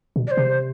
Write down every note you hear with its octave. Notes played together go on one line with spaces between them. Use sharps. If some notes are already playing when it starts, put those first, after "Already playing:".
B2
D5
C5
C3